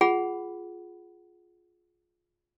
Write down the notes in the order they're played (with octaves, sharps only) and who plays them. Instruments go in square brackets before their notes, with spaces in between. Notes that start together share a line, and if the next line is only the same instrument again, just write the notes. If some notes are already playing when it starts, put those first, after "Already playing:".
[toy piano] F4 G#4 F#5 B5